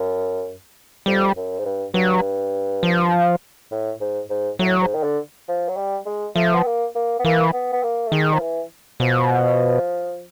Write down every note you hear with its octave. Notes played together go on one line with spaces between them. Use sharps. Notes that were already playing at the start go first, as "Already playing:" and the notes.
Already playing: F#2
F2 G3
F#2
G#2
G2
G2 F#3
F3
A2
G#2
G#2
A2 F#3
G#2
D#3
D3
F3
F#3
G3
G#3
F3 A3
B3
A#3
A#3
B3
E3 A#3
B3
B3
A#3
A3
D#3 G#3
F3
E3
B2 F3